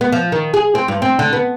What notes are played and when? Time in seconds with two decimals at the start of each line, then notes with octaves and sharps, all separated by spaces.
0.01 B3
0.12 F3
0.32 D#3
0.54 G#4
0.75 C4
0.88 G2
1.02 C4
1.19 D3
1.33 B3